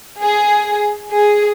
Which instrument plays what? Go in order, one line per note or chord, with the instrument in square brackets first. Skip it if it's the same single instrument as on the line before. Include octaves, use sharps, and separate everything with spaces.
[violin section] G#4
G#4